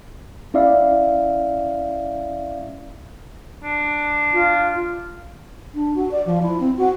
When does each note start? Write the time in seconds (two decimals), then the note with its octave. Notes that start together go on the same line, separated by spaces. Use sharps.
0.54 C#4 E4 D5 E5 F5
3.63 D4
4.33 F4
5.74 D4
5.95 F#4
6.11 D5
6.26 F3
6.43 E4
6.60 C4
6.77 F#4